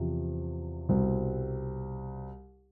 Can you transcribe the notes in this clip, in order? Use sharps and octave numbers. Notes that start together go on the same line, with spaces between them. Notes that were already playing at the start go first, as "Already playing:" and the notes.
Already playing: E2 C3 F3
C2 B2 G3 C4